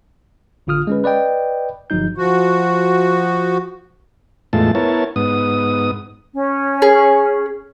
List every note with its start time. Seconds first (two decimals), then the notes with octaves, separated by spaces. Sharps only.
0.67 A1 D3 F4 D#6 F6
0.87 G#3 C#4 B4
1.04 B4 D5 D#5 G5
1.90 G1 F3 F#3 D#4 G6
2.16 F3 F#4
4.53 E2 A2 G#3 A3 F4 A5
4.75 B3 E4 A#4 C#5 A5
5.16 G#2 B3 D#6
6.34 C#4
6.82 G#4